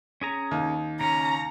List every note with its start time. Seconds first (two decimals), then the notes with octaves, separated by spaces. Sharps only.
0.21 C#4 G#4 A#5
0.51 D#2
1.01 C#3 C#4 A#5